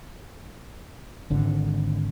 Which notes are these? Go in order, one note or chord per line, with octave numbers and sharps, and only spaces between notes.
G#1 D3